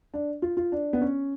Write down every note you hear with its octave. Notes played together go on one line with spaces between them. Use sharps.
D4
F4
F4
D4
B3
C#4